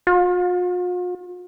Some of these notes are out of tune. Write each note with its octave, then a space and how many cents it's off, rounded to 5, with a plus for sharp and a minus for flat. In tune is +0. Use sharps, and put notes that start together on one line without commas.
F4 +45